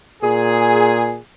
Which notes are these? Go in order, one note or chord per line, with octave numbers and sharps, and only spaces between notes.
A#2 G#4